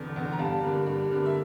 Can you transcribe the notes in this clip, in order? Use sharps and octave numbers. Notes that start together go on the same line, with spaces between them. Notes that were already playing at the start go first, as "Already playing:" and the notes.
Already playing: F1 E2 D3
E2 D3
A#5
G2 F5 A5
D3 G3 A#3
G2
D3 G3 A#3
E5